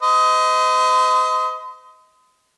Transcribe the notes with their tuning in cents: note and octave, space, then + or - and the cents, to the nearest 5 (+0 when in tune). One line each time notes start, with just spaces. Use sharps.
C5 -40 D#5 +20